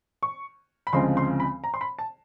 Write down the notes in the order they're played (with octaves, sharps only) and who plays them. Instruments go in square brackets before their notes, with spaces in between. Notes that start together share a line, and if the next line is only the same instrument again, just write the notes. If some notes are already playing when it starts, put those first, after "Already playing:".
[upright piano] C#6
B5
D2 C#3 F3 G#3 C4 C6
C6
B5
A#5
C6
B5
A5